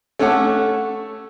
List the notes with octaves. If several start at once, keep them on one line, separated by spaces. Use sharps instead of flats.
A3 C#4 A4 F#5 D6